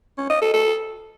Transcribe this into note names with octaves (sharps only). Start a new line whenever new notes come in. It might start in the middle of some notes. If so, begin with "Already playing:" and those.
C#4
D#5
A4
A4